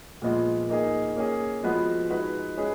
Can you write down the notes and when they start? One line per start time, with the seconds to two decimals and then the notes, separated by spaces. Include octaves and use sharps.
0.22 A#2 F3 G#3 B3 F4
0.69 A#3 D#4 G#4
1.16 A#3 C#4 G#4
1.63 F3 G#3 B3 F#4 B4
2.10 G#3 D#4 F#4 B4
2.57 G#3 C#4 G#4 B4